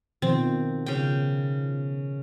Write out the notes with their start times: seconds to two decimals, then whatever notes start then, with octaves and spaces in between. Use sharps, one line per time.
0.22 B2 D#3 F3 C4
0.86 C#3 G5